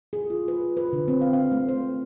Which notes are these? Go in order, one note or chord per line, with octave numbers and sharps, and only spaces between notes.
G#4
F4
B4
B4
D3
C4
F5
F5
A3
C5